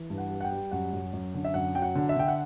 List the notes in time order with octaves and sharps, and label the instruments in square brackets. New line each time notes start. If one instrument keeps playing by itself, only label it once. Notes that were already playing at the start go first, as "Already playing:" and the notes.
Already playing: [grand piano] E3
G2
F#5
G3
F#5
G5
G3
F#2 F#5
F#2
F#2
D3
E5
F#2 F#5
F#3 G5
F#5
D3
E5
D3 G5
F#5